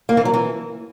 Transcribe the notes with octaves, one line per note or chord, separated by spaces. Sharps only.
A#3
E3
F#3
E3